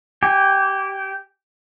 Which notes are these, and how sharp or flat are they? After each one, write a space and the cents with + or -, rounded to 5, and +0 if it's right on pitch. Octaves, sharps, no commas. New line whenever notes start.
G4 -15 G#5 -35